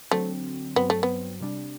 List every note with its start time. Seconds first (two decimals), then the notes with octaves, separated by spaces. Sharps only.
0.11 D3 F#3 A3 C4
0.76 G2 F#3 B3 C4
0.90 A3
1.03 B3
1.41 C3 G3 D4